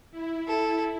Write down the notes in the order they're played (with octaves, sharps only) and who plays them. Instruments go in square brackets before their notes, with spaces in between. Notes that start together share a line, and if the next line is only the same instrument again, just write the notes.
[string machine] E4
[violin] A4